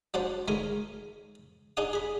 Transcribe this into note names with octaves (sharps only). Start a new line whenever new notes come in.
F#3 D4 C5 F#5 A5
D#3 G#3 A3 A#4 G#5
D4 D#4 G#4 F#5 D#6
G#4 B5